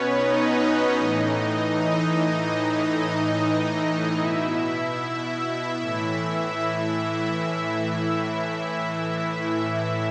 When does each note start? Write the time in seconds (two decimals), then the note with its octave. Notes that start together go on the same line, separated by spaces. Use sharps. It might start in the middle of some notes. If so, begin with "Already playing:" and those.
Already playing: B2 B3 C#4 B4 C#5
0.14 D#4 D#5
0.96 A2 E3
1.76 D#4 D#5
2.57 A2 E3
4.17 B2 E4 E5
5.78 A2 E3 E4 E5